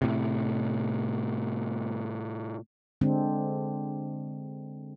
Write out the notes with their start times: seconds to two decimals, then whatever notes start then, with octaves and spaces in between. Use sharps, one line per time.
0.02 A2 C3
3.01 D3 G#3 C4 D4